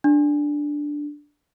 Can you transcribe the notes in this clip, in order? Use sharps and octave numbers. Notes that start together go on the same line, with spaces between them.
D4